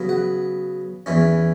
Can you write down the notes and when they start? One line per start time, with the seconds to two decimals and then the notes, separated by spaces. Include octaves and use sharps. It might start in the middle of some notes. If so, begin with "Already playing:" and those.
Already playing: C#3 F#3 B3
0.09 F#5
1.06 E2 E3 C#4